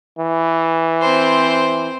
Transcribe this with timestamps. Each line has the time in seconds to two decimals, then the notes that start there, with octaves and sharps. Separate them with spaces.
0.19 E3
1.01 C4 C5